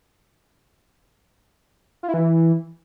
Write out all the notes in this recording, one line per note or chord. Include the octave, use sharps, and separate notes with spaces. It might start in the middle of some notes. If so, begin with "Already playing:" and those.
F4
E4
E3